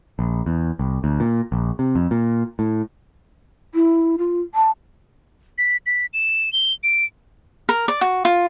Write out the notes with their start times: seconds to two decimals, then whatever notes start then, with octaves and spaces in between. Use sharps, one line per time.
0.19 A#1
0.46 E2
0.79 C2
1.04 D2
1.20 A#2
1.52 A#1
1.79 C3
1.96 F2
2.11 A#2
2.59 A2
3.74 E4
4.18 F4
4.55 A5
5.58 B6
5.86 B6
6.13 E7
6.53 G7
6.83 D7
7.69 A#4
7.88 D5
8.01 F#4
8.25 F4